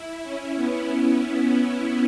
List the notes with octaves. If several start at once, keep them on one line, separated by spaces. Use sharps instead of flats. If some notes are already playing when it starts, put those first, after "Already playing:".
Already playing: E4
C#4
B3